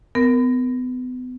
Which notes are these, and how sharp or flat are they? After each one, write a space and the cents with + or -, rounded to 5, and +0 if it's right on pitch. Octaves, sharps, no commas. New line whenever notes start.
B3 +35 A#4 +0